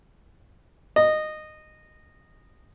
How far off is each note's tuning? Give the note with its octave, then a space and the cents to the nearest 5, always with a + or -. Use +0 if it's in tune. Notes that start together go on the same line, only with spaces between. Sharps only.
D#5 -15